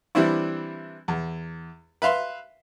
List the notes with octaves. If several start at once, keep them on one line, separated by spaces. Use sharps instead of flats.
E3 G3 C4 D4 E4
E2
B4 E5 F5 C6